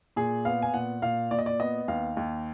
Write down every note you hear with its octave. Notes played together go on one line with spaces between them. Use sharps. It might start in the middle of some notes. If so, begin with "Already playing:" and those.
A#2 G#4
B3 F5
G#5
A#2 F#5
A#2 F5
A#2 D5
D#5
D5
B3 D#5
D#2 F5
D#2